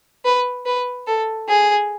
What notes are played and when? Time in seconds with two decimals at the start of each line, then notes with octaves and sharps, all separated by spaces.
0.25 B4
0.66 B4
1.07 A4
1.49 G#4